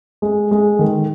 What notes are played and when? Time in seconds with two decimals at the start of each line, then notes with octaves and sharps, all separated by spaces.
0.22 G#3
0.51 G#3
0.79 D#3